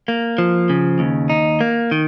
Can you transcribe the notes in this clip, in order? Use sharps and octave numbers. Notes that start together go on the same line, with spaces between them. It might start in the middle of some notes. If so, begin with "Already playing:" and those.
A#3
F3
C#3
D#2
D#4
A#3
D#3